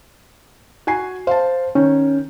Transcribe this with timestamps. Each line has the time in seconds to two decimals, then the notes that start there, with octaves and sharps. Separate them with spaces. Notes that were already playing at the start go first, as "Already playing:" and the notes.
0.87 F#4 G#5 C7
1.27 C5 F5 A5
1.75 D#3 C#4